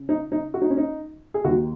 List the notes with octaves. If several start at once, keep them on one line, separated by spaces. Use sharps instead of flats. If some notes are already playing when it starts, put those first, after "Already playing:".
Already playing: C#3
D#4
D#4
F#4
D#4
C#4
D#4
G#4
D#2 D#3 F#4